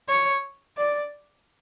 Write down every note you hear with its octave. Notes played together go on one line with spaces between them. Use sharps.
C#5
D5